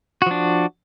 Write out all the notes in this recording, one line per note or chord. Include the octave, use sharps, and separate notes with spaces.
F3 D4 F#4